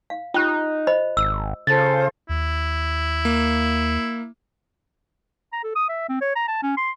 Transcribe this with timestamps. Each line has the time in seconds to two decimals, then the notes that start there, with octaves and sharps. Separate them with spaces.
0.10 F5
0.34 D#4 F4 G4 G5 F#6
0.87 C5 D#5 B5
1.17 G#1 E6
1.67 C#3 F4 A4 C5 A6
2.29 D#2 E4
3.25 A#3
5.52 A#5
5.64 A4
5.75 D#6
5.89 E5
6.09 C4
6.22 C#5
6.36 A#5
6.48 A5
6.62 C#4
6.77 C6